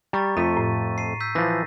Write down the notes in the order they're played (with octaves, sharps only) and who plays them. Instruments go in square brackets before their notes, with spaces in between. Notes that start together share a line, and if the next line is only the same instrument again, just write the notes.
[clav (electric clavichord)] G3 [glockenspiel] A#5 C#6 A6
[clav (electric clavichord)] F2 A3 [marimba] F4 [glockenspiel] B6 D#7
[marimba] A2
[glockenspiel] C7 D#7
E6 G6 B6
[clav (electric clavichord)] E3 F3 [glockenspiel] A6 A#6